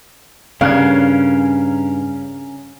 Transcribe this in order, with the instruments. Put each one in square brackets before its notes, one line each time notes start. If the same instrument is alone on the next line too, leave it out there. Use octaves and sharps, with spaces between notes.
[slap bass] G2 [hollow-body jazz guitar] C#3 [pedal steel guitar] C#4 A#4 [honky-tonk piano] F5 F#6 G#6